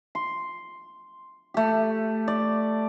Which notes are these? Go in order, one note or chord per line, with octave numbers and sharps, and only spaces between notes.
C6
A3 G4
D5